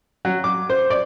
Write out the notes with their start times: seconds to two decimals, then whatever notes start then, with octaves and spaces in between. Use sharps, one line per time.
0.25 F#3
0.44 D6
0.70 C5
0.90 D5